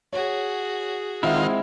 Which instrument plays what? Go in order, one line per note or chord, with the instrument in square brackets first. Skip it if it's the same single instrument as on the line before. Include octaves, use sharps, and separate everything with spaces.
[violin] F#4 G#4 [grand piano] C#5
[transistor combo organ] D#3 F4 [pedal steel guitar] G#3 C4 E4 [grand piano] E5 F#5